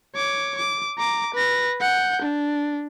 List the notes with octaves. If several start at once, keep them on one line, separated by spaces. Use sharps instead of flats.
C#5 D6
D6
A#5 D6
B4 A#6
F#5 G6
D4